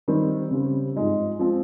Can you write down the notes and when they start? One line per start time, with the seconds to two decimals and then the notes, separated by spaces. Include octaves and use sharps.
0.08 D#3 G3 C4
0.51 C#3 G3 C4 G4
0.96 G#2 F3 G#3 D#4
1.39 F3 G#3 C4